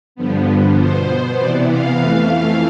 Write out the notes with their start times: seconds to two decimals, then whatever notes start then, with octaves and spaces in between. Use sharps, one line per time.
0.15 G2 D3 F3 B3
0.77 B2 B3 C5
1.38 C3 E3 B3 D5
1.69 F5
1.99 F2 E3 A3